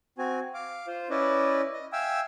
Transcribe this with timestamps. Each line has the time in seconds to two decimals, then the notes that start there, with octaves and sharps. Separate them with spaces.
0.18 C4 F#4 G#5
0.54 F5 D6
0.87 F4 C5
1.10 C#4 E4 B4 D5 D#5
1.73 D#5
1.93 E5 F5 G5 G#5 E6